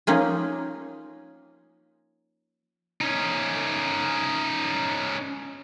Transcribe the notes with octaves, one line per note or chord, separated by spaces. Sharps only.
F3 A#3 C#4 D#4
C#4 D#4